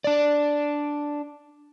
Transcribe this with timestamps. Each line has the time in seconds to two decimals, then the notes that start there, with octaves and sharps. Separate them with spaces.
0.04 D4 D5